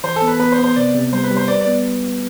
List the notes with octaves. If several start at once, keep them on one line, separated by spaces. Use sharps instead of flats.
E3 C5
A4
B3
B4
B3 B4
C5
B3
C5
C3 D5
C3
G3 C5
B4
G3
C5
B4 D5
D5
B3